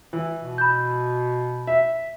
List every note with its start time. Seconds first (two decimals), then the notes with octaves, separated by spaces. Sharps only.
0.13 E3
0.41 B2
0.58 B5 G6
1.67 E5